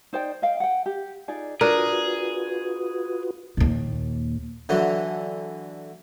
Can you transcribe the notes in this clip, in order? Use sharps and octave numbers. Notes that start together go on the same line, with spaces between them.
D#4 C5 D5 G5
D#5 F5 G5
F#5 G5
G4
D#4 F4 G#4 D5
D4 F4 F#4 G#4 A#4 B4
D#2 A#2
D3 E3 F#3